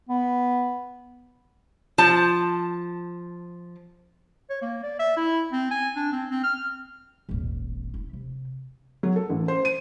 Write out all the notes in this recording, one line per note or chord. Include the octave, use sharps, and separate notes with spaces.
B3
F3 A5
C#5
A#3
D5
E5
E4
C4
G#5
D4
C4
C4
F6
D#1 G#1
E4
C3
F#3
A4
A1
C5
D#7